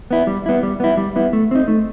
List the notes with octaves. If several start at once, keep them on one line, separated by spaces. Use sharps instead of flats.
B3 E4
G3
B3 E4
G3
B3 E4
G3
B3 E4
A3
C4 D#4
A3